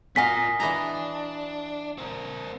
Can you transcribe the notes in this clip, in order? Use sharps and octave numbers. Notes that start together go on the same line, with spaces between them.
F4 F#4 A#4 D#5 F5 F#5 G#5 B6
E3 D4 D#5 A#5
C4 A#4